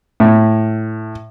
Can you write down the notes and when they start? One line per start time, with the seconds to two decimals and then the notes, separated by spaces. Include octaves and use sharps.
0.20 A2